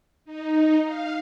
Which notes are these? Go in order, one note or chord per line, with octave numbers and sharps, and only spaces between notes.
D#4
F5